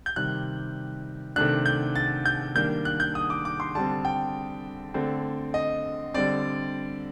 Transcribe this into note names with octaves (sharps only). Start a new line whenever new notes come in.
G6
C3 D#3 G3 F#6
C3 D#3 A3 D4 F#6
G6
A6
G6
D#3 G3 A#3 D4 G6
F#6
G6
D#6
D6
D6
C6
D3 G3 C4 A5
G5
D3 A3 C4
D#5
D3 G3 C4 D5